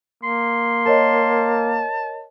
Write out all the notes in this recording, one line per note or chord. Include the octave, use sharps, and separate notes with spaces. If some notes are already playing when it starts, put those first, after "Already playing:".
A#3 C6
A#4 C#5 D#5 A5